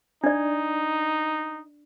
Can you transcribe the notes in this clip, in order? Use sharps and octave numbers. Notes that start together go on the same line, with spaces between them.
D4 D#4 D5